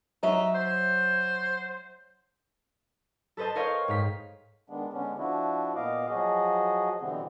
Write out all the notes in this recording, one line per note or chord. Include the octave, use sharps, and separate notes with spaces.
F#3 D#4 E5
C5
A4 B4 C5 D#5 A5
A#4 C5 C#5 D#5 F5 G5
G#2 F5 B6
D#3 G#3 B3 D4
D3 G#3 B3 C#4 D4
F3 D4 E4 F#4
A#2 B3 D#5 F5 D6
F3 F#3 F#4 G#4 D#5
B2 D3 E3 G3 B3 C4